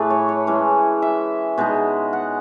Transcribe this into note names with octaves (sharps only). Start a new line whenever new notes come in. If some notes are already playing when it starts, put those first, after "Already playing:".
Already playing: A2 E3 A3 G#4 B4
C#5
C#5
E3 G#3 C#4
E5
B2 G#3 D#4
F#5